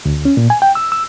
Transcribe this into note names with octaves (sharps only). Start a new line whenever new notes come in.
D2
C#4
A#2
G#5
G5
E6
E6